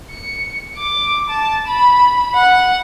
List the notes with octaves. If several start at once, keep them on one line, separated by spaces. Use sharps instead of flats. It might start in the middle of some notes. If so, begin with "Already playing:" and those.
C#7
D6
A5
B5
F#5